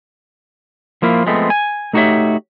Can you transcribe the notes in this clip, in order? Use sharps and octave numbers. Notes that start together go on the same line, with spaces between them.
F3 A#3 E4 F4
F3 G#3 A3 B3 C4
G#5
A3 D#4 F#4 G4 C#5 E5